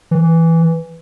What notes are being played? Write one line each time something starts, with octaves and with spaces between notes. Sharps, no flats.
E3